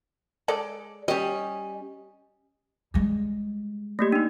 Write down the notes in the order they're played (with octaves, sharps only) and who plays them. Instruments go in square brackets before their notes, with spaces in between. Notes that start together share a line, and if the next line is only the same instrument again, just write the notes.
[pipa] G#3 A4 D5
[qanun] G3 C#4 [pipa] G4 D#5
[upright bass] G3 G#3
[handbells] A3 A#3 G4
D4 D#4